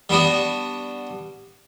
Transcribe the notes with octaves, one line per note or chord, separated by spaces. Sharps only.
G3 B3 D4 F#4